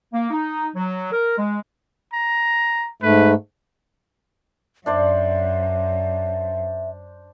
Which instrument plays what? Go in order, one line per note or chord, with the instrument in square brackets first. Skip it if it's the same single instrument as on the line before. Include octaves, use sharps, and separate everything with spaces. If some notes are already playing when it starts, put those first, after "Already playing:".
[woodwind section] A#3
D#4
F#3
A#4
G#3
[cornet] A#5
[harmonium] G#2 A3 [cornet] B4
[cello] F#2 [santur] D4 C5 D5 [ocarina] E5